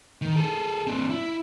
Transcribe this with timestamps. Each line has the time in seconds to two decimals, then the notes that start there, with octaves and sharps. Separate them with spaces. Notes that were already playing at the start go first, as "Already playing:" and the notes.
0.22 D#3
0.36 G#4 A4
0.87 C4 D4
1.10 E4